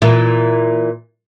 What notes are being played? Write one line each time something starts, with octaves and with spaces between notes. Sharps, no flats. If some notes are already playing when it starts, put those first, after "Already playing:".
A#2 E3